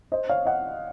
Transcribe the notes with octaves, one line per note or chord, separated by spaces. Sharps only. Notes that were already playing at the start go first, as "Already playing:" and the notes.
C5 D#5
C#5 F5
D#5 F#5